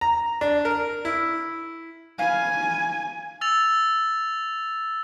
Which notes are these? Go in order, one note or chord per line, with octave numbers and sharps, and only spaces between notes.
A#5
D4
A#4
E4
F5 G#5 B5 F6
E6 A6 F7